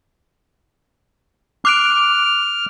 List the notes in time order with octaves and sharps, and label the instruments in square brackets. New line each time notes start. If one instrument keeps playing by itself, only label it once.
[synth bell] D6 F#6 D7 [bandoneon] F6